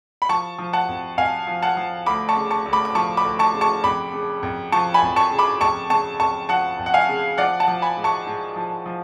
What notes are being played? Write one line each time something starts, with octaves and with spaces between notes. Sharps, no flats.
B5
F3 A5 C#6
F3
F#5 A5
F2
F2 F5 G#5
F3
F#5 A5
F3
D2 B5 D6
A5 C#6
C#3
A5 C#6
D2
B5 D6
D6
F3 A5 C#6
B5 D6
D2
A5 C#6
C#3
A5 C#6
F2 B5 D6
C#3
F2
F3 A5 C#6
G#5 B5
F2
A5 C#6
C#3
B5 D6
F2 A5 C#6
C#3 A5 C#6
F2 A5 C#6
F3 F#5 A5
F2
F#5
F5 G#5
C#3
F3 D5 F#5
F#5 A5
F3
G#5 B5
G#2
A5 C#6
G#2
F3
F3